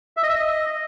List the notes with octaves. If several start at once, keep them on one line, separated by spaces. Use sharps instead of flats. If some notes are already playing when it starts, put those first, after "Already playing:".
E5
D#5
E5
D#5